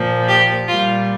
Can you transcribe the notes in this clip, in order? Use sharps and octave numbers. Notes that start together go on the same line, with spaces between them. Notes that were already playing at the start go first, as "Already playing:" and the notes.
Already playing: A#2 F3
G4
A#2 G3 F4